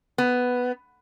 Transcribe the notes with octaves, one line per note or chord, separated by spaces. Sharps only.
B3